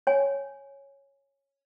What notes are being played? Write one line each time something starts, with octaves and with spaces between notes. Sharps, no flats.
C#5 G#5